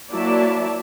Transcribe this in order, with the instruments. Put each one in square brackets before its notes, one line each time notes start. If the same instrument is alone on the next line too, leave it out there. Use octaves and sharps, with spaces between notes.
[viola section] F#3 A#3 E4 D5 E5 A5